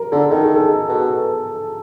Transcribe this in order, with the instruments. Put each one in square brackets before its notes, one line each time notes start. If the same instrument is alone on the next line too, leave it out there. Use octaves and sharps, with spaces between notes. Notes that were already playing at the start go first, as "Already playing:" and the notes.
Already playing: [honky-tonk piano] A#4
[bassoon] D3 [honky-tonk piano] A4
[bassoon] D#3 [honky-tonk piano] A4
[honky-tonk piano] G#4
A4
[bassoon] B2